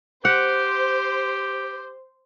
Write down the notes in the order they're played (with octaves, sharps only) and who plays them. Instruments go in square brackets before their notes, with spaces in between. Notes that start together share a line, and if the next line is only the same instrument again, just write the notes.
[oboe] G4 [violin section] C5 [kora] F#5